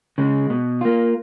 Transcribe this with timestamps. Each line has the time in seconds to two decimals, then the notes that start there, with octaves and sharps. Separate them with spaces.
0.18 C#3 G#3
0.50 B2
0.81 A#3 F4